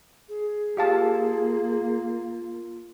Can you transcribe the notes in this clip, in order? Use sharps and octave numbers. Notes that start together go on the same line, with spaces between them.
G#4
A#3 F4 G4 F5 A5